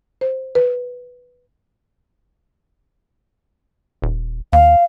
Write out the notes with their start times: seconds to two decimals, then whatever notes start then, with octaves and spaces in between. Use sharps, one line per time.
0.21 C5
0.55 B4
4.02 D#1
4.53 D#2 F5